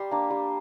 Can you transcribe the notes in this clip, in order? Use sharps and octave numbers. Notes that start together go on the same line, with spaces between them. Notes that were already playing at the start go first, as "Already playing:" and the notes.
Already playing: G3 C6
A#3 D4
G3